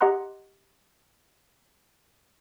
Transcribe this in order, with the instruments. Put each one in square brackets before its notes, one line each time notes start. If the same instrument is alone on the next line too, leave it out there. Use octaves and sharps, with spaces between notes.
[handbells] G4 D#5 F#5 A#5 C6 F#6